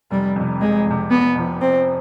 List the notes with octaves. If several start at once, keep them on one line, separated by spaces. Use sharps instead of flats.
F1 G3
F2 C3
F1 G#3
F2 C3
F1 B3
F2 C3 F3
F1 C4